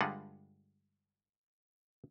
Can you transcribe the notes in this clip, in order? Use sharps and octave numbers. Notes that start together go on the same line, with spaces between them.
G2 D3 G3 G#3 F4 F#5